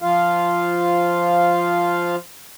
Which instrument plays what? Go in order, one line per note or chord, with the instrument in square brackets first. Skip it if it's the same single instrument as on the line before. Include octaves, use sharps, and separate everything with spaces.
[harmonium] F3 F4 F5